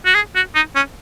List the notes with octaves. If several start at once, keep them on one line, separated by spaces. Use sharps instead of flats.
F#4
G#4
F#4
D#4
C#4